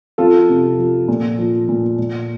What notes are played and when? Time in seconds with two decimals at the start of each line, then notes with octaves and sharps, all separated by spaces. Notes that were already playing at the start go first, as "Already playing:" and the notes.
0.18 F2 F4 A4
0.49 C3
0.78 F3
1.08 A#2
1.38 F3
1.69 A#2
1.99 A#2